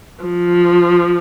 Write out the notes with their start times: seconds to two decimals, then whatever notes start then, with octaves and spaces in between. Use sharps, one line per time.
0.24 F3